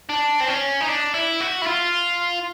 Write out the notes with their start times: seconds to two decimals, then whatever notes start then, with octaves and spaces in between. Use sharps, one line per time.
0.10 D4
0.41 C4
0.48 C#4
0.81 D#4
0.88 D4
1.14 E4
1.40 F#4
1.62 E4
1.66 F4